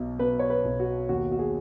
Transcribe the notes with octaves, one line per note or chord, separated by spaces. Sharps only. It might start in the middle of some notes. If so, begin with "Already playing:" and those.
Already playing: B1 B2
B2 B4
C#5
B4
B1
F#4
D#2 F#4
F#4
G#4